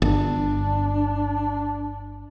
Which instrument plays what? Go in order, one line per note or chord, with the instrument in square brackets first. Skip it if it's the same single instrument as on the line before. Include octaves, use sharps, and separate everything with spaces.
[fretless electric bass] G1 [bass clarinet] D4